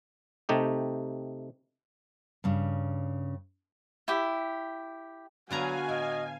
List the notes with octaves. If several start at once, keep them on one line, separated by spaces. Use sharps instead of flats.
C3 A3 D#4 G4
G2 C#3
E4 G4
D3 F#3 B3 F#4 F5 G#5 A#5
A2 D#5